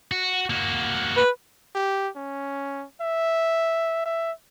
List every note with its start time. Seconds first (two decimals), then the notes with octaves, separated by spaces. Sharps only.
0.12 F#4
0.50 A#3 F#4
1.17 B4
1.75 G4
2.16 C#4
3.01 E5
4.06 E5